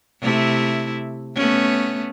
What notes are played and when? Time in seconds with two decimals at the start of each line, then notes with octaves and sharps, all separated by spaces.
0.21 C3 A3 E4
1.35 A3 B3 C#4